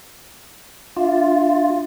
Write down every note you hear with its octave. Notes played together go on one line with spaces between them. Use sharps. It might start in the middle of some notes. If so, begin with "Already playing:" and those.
D4 F4 E5